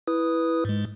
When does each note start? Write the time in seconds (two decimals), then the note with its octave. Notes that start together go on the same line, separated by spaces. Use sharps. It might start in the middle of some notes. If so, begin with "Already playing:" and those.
0.07 E4 B4 D#6
0.65 G#2 G#3